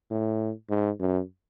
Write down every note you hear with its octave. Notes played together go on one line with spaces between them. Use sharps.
A2
G#2
F#2